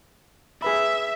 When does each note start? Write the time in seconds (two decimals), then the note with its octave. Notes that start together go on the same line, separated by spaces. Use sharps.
0.62 G#4 B4 E5 B5